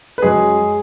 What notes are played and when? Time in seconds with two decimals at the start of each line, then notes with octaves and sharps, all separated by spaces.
0.18 B4
0.22 F#2 F#3 G#3 G#4